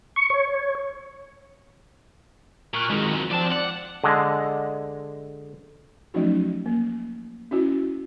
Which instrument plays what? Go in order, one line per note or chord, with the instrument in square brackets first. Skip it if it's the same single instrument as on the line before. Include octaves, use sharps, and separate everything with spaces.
[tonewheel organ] C#6
C#5
[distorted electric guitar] A#2 [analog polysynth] C#6 F6 F#6
[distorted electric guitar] F2 F#3 [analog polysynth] D#3 G#3
[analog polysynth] F3 C4 [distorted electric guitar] D5 A5
[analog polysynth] D5 [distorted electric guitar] F#5
[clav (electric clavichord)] D3 G#3
[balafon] F3 F#3 A3 C#4 D#4 F#4
A#3
C#4 E4 F#4